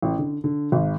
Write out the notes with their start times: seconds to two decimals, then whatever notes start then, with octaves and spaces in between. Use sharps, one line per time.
0.02 A1
0.19 D3
0.44 D3
0.72 G#1